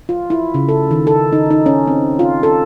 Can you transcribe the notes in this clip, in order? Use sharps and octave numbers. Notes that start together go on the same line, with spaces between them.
F4
E4
C#3
A4
D#3
A4
D#4
D#4
C#4
C4
F4
A4